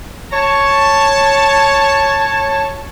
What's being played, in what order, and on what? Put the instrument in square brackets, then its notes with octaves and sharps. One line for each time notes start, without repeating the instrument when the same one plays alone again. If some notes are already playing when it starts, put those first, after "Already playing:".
[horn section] C#5 A5